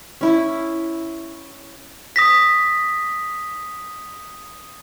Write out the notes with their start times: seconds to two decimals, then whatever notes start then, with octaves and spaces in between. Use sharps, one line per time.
0.21 C#4 E4
2.16 D#6 A#6 B6